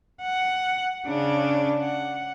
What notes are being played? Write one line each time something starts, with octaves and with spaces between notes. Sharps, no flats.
F#5
C#3 D4
F#5